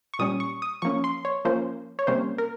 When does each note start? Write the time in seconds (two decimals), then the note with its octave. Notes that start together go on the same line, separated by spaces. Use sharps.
0.14 C#6
0.19 A#2 G3 C#4 D#6
0.40 C#6
0.62 D#6
0.82 F3 A#3 C#4 C#6
1.04 C6
1.25 C#5
1.45 F3 A#3 C#4 C5
1.99 C#5
2.07 C3 G3 A#3 C#4 C5
2.38 A#4